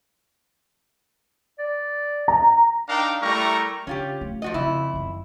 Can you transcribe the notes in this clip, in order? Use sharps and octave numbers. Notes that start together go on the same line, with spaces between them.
D5
A#5
D4 D#4 A#4 F5 G5 A#5
G3 A3 E4 A#4 A#5 C#6
C#3 C#4 F4 G4
A3
F3 F#4 D#5
F2 C#3 E4
F#2 D#3